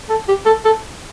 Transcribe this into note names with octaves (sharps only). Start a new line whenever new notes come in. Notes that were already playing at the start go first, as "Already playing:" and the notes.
A4
G4
A4
A4